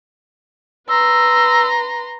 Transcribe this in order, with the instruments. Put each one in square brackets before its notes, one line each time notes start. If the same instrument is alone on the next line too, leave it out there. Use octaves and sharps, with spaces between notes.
[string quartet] B4 A#5 C6 [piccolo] E6